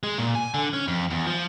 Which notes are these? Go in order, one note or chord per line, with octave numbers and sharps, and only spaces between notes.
G#3
A#2
G#5
D3
C#4
F2
E2
F3